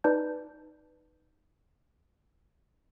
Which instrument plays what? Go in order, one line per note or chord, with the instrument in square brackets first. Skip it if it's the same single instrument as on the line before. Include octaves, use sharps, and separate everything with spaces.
[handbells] D#4 B4 D5 A5 G6